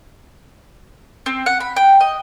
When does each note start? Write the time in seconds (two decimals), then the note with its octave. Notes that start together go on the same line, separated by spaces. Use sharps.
1.26 C4
1.46 F#5
1.60 B5
1.76 G5
2.01 D#5